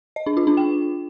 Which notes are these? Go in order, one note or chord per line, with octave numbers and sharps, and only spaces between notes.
D#5
D4
F4
D4
G5